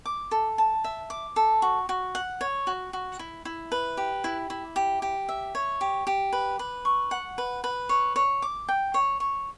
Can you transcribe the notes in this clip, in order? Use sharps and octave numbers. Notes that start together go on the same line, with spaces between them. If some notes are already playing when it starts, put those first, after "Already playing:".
D6
A4
A5
E5
D6
A4
F#4
F#4
F#5
C#5
F#4
F#4
E4
E4
B4
G4
E4
E4
G4
G4
E5
C#5
G4
G4
B4
B4
C#6
F#5
B4
B4
C#5
C#5
D6
G5
C#5
C#5